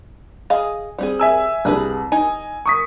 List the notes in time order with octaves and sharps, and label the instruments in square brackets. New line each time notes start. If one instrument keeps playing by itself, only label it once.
[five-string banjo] G#4 D#5 F5
G3 C4 G#4
[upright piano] E5 G#5 E6
[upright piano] C2 [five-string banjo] D4 G#4 B4
[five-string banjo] D#4 [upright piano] G#5
[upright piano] C#6 D#6 B6